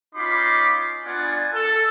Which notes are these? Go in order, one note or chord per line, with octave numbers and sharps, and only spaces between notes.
C#4 D#4 F4 B5 C6 D6
B3 D4 F4 D5 F#5 G#5
A4